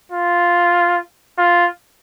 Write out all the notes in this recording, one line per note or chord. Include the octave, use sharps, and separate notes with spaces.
F4
F4